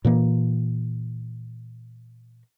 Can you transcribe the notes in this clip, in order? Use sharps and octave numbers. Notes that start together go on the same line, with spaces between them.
A#2 E3 A#3